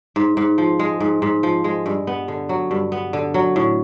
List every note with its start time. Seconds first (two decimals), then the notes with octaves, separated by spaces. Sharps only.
0.16 G#2
0.37 G#2
0.58 F3
0.80 G#3
1.00 G#2
1.22 G#2
1.43 F3
1.64 G#3
1.86 G2
2.07 B3
2.28 D3
2.49 F#3
2.71 G2
2.92 B3
3.13 D3
3.34 F#3
3.56 A2